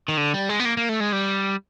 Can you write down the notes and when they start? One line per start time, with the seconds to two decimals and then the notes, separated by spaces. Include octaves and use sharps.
0.08 D#3
0.17 D3
0.34 G3
0.49 G#3
0.60 B3
0.65 A#3
0.77 A#3
0.89 A3
1.00 G#3
1.13 G3